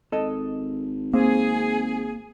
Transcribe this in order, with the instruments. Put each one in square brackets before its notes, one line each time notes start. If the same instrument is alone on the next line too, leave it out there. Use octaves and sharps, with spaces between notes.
[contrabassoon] G#1 [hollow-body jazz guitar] A4 D#5
[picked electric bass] A#3 [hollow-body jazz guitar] C4 [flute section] G#4